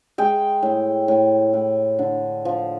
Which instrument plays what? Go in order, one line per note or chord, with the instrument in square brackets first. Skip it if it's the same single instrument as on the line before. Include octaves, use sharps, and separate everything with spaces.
[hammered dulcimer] G#3 G5
A2
A2
A2
D3
F3